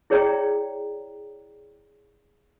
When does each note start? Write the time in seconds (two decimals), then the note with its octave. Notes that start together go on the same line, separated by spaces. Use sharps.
0.10 E4 G#4 C#5 D5 G5 A#5